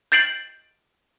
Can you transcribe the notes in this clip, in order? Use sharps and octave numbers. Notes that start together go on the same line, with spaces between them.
G6 A6 C7 D7 F#7